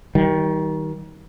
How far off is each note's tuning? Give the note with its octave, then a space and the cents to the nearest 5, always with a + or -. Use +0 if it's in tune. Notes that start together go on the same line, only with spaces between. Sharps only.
D#3 +25 G3 -25